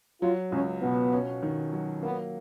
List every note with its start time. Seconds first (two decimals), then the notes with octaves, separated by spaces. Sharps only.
0.22 F#3 F4
0.52 C#2 C#4
0.82 B2 B3
1.13 C#4
1.42 D#3
1.73 F#3
2.02 A#3 B3